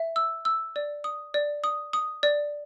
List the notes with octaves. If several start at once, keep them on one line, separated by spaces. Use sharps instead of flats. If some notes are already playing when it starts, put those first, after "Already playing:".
Already playing: E5
E6
E6
D5
D#6
D5
D#6
D#6
D5